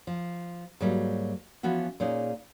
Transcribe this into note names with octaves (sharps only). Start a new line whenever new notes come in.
F3
G#2 F#3 G3 A#3
E3 F3 B3 C#4 F#4
A#2 C#4 D#4 G#4